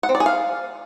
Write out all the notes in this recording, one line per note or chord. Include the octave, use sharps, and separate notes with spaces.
F#5
C4
D5
G#4
F5